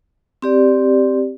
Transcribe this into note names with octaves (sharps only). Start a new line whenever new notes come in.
C4 G4 D5